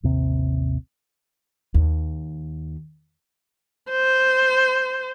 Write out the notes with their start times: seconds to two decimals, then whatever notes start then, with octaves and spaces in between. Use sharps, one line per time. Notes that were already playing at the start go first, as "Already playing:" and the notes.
0.03 A1 D#2 C3 C4
1.74 D#2
3.91 C5